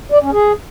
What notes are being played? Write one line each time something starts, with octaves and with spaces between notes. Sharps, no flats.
D5
C#4
G#4